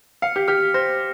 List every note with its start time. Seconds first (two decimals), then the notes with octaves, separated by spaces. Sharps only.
0.22 F5 C#7
0.36 G4
0.48 G4 F6
0.74 C5 A#6